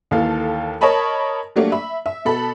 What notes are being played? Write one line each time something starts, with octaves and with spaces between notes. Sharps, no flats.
D#2 E3 A4 F5
A#4 C#5 D#5 A5 B5 C#6
F#3 G3 A3 A#3 D4
E5 B5
E5
B2 A4 B5